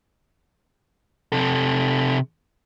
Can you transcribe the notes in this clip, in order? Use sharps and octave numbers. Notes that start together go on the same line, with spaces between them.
C3 A4